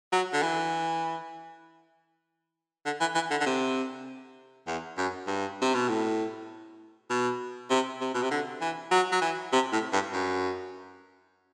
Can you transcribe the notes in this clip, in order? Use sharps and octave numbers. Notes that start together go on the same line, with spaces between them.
F#3
D3
E3
D3
E3
E3
D3
D3
C3
E2
F#2
G2
C3
B2
A2
B2
C3
C3
B2
C3
D3
E3
F#3
F#3
E3
C3
A2
G2
F#2